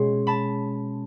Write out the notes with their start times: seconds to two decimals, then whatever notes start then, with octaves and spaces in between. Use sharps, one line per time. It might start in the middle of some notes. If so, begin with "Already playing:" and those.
Already playing: B2 G#3 C#4 C6
0.27 A5 B5